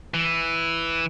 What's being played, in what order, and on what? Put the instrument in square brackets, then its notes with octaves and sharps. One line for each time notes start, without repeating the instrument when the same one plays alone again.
[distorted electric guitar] E3